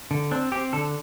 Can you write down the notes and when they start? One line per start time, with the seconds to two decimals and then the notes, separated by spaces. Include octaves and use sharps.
0.11 D3
0.31 C4 D4
0.52 C4 G4
0.73 D3 A4